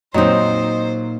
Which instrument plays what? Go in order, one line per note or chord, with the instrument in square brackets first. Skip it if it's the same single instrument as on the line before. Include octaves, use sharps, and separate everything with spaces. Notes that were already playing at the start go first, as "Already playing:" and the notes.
[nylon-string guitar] A#2 D#4 [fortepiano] F#3 C4 [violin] C5 [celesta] D#5 D#6